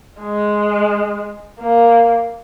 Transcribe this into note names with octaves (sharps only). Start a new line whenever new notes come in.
G#3
A#3